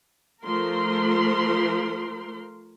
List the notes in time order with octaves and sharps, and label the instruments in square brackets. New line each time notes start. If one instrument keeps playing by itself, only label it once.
[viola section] F3 A3 A#4 C6